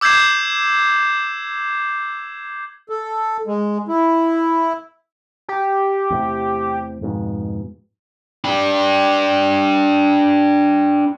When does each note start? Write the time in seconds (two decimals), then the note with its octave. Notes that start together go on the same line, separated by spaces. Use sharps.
0.01 D6 E6 G6 G#6 C7 E7
2.89 A4
3.47 G#3
3.88 E4
5.49 G4
6.10 E2 A2 C3
7.02 F2 G#2 B2
8.44 D4 G4